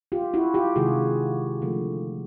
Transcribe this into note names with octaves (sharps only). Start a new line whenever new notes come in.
F4 G4
E4 F#4
F4 G4
C3 D#3 G#3 F#4 G#4
D3 F3 A3